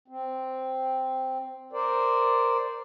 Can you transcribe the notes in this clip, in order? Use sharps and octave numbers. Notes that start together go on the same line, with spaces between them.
C4
A#4 C5 D5